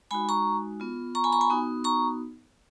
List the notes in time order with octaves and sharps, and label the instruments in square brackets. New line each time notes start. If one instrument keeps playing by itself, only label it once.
[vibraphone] G#3 D#4 F#4 G#5 B5
A#5 C#6
B3 F4
A#5 C#6
G#5 B5
A#5 C#6
G#5 B5
B3 D#4 F#4
A#5 C#6